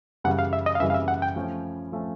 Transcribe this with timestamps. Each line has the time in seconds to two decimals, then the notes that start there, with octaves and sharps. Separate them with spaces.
0.24 F#2 C#3 E3 G3 F#5
0.39 F5
0.53 E5
0.66 D#5
0.75 F5
0.80 F#2 C#3 E3 G3 E5
0.90 F5
0.94 E5
1.08 F#5
1.22 G5
1.36 F3 A3 C#4
1.92 F3 A3 C#4